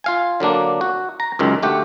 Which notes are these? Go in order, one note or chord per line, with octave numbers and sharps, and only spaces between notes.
F4 F5 G#5
D3 F#3 A#3 D4
F#4
A#5
C#2 F#2 D#3
D2 A3 G4 F#5